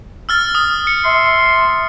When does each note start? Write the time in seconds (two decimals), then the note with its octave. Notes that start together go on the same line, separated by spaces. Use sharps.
0.29 E6 F6 A6
0.55 D#6
0.87 C#7
1.04 E5 C6